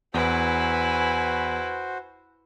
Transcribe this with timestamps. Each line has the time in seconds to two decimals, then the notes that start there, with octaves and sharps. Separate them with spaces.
0.14 E2 E4 F#4 B4 C5 G#5